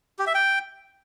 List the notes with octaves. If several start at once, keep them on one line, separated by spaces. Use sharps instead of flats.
G4
E5
G5